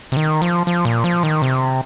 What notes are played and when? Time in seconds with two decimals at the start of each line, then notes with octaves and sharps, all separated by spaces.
0.12 C3
0.17 D#3
0.42 F3
0.67 F3
0.85 A#2
1.04 F3
1.23 D#3
1.42 C3